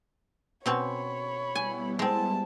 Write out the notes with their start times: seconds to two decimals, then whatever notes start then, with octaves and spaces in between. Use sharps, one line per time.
0.66 B2 C4 C#4 C#5 B5
1.55 G3 B3 E4 G#5
1.99 G#3 C4 A5